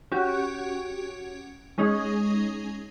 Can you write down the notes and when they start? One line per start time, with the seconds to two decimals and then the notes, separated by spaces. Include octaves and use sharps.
0.12 C#4 F#4 G4
1.78 G#3 C#4 D#4 G#4